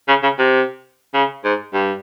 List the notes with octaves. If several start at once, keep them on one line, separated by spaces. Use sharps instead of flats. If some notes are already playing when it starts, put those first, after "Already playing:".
C#3
C#3
C3
C#3
G#2
G2